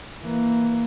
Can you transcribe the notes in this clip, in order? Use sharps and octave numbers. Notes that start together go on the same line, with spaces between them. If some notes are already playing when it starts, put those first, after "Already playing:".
E3 A#3